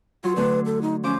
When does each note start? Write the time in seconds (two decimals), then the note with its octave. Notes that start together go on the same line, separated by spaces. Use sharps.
0.24 F#3 F4 C6
0.36 D3 A3 D4 B4
0.66 A4
0.82 D#4
1.04 F3 C#4 C5 D6